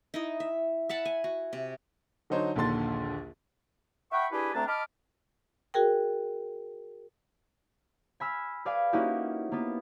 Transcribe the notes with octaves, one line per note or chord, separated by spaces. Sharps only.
D#4 E4 D#5
E5
E5 F#5 A5 B5
G#5
F#4
C3
D3 F#3 D#4 C5 C#5
A#1 D#2 D3 C6 A6
E5 F#5 G5 B5 C#6
D4 E4 G4 G#4 B4
D2 A3 C4 D4 A5 A#5
D#5 A5 B5 D6 F6
F#4 G#4 A#4 G5
G#5 B5 E6 F6
G#4 B4 D5 F5 G#5
A#3 C#4 D#4 E4 F#4 G4
A#3 B3